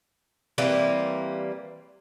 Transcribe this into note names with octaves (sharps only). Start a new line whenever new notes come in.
E3 G3 A#3 C4